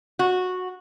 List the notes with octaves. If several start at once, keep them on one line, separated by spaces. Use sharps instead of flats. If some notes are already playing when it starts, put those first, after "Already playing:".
F#4